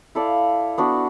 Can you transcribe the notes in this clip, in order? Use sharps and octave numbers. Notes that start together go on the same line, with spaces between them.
E4 A4 D5 F5
B3 D4 F#4